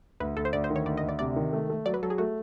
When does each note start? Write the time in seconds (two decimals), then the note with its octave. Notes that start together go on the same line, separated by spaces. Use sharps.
0.20 D2 B4
0.37 D2 A4
0.45 C5
0.53 D2 D5
0.64 C5
0.70 D#3
0.76 C#5
0.86 D2 D5
0.97 D#5
1.03 D2
1.09 D5
1.19 C3 D5
1.36 D#3
1.53 A3
1.70 A3
1.86 F#3 D5
1.94 B4
2.03 F#3 A4
2.10 G#4
2.18 A3 F#4